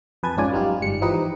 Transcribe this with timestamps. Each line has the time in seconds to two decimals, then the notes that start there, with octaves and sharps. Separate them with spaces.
0.23 F2 B4 G#5 A5 G#6
0.37 G#1 G#2 C#4 F4 D5 G#5
0.52 F#3 G3 D#4 F4 G4
0.81 G1 G#2 G3 C#7
1.01 E3 F3 D#4 G4 B4 D#5